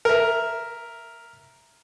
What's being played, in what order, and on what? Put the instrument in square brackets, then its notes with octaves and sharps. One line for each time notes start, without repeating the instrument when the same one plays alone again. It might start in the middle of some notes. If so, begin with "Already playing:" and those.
[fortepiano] A#4 E5